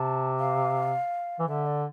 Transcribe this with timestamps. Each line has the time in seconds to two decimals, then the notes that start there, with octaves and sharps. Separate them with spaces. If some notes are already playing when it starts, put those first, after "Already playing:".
Already playing: C3 A5
0.39 F5
1.39 E3
1.47 D3 E5
1.66 D5